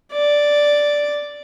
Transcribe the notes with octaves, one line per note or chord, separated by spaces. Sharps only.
D5